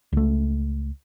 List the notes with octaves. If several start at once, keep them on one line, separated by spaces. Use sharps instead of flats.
C#2 A3